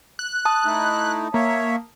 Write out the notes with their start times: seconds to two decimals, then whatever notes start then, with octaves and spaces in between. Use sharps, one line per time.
0.19 F#6
0.45 A5 D#6
0.65 A3 D#4 E4
1.34 A#3 C#5 E5